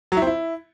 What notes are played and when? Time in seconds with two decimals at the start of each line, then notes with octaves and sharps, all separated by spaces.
0.12 F#3
0.17 E4
0.22 C4
0.27 E4